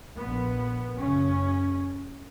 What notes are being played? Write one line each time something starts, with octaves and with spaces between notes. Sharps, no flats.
A#1 A#2 B3
F#1 F#2 C#3 C#4